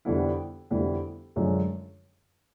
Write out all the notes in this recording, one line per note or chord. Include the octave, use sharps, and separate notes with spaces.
F2 D3 G3 B3 E4
F2 D3 G3 B3 E4
F#2 D3 F3 G#3 C#4